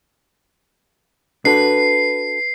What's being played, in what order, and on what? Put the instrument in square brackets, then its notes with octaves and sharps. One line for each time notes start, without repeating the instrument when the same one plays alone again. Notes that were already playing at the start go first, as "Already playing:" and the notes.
[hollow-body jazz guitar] D4 F#4 A4 [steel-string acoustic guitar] B4 [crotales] C7